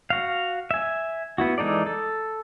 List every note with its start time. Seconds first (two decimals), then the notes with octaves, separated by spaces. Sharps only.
0.10 F#4 F5
0.71 E5 G#5
1.38 B3 E4 F#4
1.58 E3 G#3 D#4 A4 D5
1.86 A4